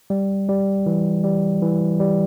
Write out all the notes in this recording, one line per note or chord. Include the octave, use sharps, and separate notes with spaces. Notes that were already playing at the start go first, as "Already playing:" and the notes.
G3
G3
E3
G3
E3
G3